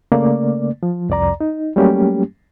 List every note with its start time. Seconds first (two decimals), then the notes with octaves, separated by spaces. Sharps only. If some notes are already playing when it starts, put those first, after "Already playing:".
0.12 C#3 A3 A#3 D5
0.83 F3
1.09 C2 F2 D5 A#5
1.41 D#4
1.76 F#3 G3 A3 A#3 C#4 G4